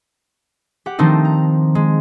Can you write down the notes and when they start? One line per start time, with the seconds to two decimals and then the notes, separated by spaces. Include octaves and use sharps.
0.86 G4 F#5
0.99 D#3 F3 A3 C4 D4 D#4
1.25 A#5
1.75 G#3